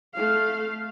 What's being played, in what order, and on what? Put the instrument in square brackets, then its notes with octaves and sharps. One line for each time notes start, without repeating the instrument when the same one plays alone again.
[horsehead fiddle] A3 F5